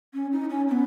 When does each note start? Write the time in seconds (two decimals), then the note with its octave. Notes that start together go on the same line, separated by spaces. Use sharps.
0.14 C#4
0.32 D#4
0.49 C#4
0.68 C#4
0.71 B3